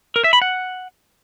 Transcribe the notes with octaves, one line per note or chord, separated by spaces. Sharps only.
A#4
E5
B5
F#5